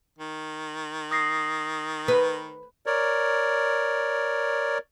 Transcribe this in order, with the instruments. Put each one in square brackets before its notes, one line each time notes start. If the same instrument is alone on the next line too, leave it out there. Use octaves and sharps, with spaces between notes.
[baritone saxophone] D#3
[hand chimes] D#6 A#6 C7
[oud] B4
[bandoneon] A#4 C#5 D5